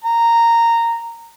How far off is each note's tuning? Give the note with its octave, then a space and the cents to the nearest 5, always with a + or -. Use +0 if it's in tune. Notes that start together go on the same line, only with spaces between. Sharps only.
A#5 -10